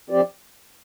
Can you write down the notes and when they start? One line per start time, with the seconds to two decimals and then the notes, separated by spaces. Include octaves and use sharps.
0.10 F3 C4 G4 D5